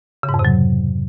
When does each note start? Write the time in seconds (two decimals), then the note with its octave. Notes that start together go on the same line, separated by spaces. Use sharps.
0.23 C#3
0.29 G#2
0.34 F2
0.39 C3
0.45 F#3